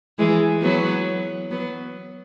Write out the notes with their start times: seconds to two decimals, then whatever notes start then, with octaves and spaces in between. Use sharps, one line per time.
0.19 E3 G#3
0.62 F#3 B3
1.51 F#3 B3